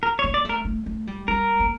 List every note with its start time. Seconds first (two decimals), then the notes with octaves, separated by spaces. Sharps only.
0.03 A#4
0.19 C#5
0.24 A#3
0.34 D5
0.45 A3 A#4
0.65 A3
0.86 A3
1.07 G3
1.28 G3 A#4
1.60 A#3